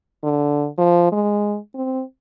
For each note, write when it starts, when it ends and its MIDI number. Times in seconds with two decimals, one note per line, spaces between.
0.23 0.67 50
0.78 1.07 53
1.12 1.57 56
1.75 2.03 60